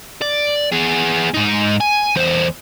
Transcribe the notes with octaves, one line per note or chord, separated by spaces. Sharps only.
D5
B3 G#4
G#2 D#4
G#5
E2 C5